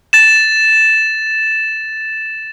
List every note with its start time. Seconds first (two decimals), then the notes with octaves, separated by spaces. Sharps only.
0.13 A6 E7